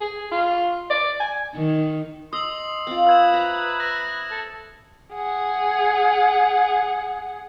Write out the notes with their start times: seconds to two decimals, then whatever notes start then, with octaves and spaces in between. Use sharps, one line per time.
0.01 G#4
0.31 F4
0.90 D5
1.20 G#5
1.55 D#3
2.33 D#5 C6 D#6 E6 F#7
2.87 C4 F4
3.07 B4 E6 G#6 E7
3.34 E5 A#5
3.80 E6 F#6 A#6
4.31 A4
5.14 G#4 F#5